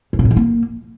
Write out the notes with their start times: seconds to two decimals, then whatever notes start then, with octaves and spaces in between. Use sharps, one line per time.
0.13 G2
0.19 C3
0.25 A2
0.31 D#3
0.37 A#3